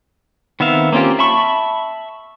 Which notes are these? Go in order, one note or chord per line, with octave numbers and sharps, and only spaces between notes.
D#3 B3 C4 E5 F5
A#3 C4 C#4 F4 G4
E5 A5 B5 C#6